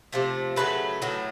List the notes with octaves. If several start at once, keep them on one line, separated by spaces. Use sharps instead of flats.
C3 F3 A3
C#3 F#3 A3 B4
A2 F#3 A3